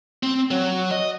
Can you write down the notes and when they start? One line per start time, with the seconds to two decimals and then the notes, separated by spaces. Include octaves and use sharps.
0.23 C4
0.51 F#3
0.91 D#5